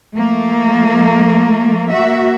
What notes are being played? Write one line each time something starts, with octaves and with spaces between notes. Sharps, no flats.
F3 A3 A#3
A#3 F#4 E5